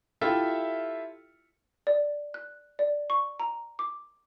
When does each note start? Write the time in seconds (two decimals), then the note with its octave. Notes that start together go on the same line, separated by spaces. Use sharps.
0.21 E4 F4 G4 A4 E5
1.87 D5
2.34 F#6
2.79 D5
3.10 C#6
3.39 A#5
3.79 D6